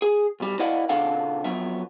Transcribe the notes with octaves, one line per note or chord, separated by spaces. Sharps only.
G#4
B1 G3
E4 B4 D5 D#5 F5 F#5
A#2 C#3 D4 A4 F5 F#5
F2 F#3 B3 E5